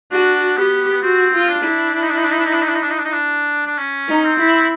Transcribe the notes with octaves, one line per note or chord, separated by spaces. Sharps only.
D4 F#4
B3 G4
B3
C4 F#4
F4
D4
E4
D4
D#4
D4
D#4
D4
D#4
D4
D#4
D4
D#4
D4
D#4
D4
D#4
D4
D#4
D4
D4
C#4
D#4
C4
E4